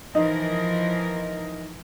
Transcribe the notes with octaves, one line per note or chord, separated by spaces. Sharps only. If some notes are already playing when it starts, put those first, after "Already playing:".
E3 F3 D#4 A#4